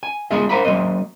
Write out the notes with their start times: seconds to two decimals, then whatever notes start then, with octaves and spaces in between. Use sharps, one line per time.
0.03 G#5
0.31 G#3 B3 F4 G#4 D#5 E5
0.49 A#4 C5 E5 F5 A#5 B5
0.65 F#3 A#3 C4 D#5